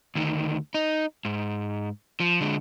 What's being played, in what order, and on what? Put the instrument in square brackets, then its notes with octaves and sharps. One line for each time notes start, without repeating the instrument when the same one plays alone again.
[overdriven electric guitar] D2 D#3
D#4
G#2
F3
D3 G#3